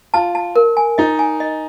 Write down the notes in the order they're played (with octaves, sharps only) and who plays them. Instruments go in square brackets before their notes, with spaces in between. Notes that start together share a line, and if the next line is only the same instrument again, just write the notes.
[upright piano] F4 [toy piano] A5
[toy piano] A5
A#4
G#5
[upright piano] D#4 [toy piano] D#5
[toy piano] G#5
D#5